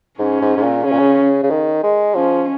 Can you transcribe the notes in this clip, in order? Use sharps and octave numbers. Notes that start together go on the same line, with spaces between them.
G#2 C#4
G#2
G#2
A#2
C#3 C#4
A#2
C#3
C#3
D#3
G#3
F3 C#4